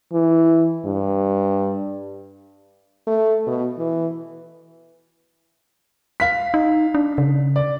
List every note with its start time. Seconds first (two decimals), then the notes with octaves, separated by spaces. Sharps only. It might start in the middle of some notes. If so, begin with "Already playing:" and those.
0.13 E3
0.85 G2
3.07 A3
3.47 B2
3.78 E3
6.20 F5 B6
6.54 D#4
6.95 D4
7.18 C#3
7.56 D5